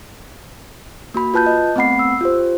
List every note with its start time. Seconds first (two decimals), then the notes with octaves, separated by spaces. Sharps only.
1.14 A#3 F#4 B5
1.34 F4 B4 A5 F#6 G6
1.47 D#5
1.76 A3 B3 C4 F#5 B5 C7
1.99 E6
2.21 F4 G4 C5